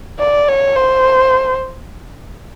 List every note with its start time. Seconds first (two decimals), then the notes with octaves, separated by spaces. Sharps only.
0.20 D5
0.48 C#5
0.76 C5